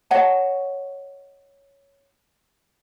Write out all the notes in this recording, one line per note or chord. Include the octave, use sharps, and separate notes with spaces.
C#5 D#5 F#5 A5